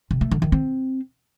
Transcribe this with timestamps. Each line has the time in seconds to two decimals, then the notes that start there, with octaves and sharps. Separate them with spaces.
0.11 C3
0.21 A3
0.31 D3
0.42 D#3
0.52 C4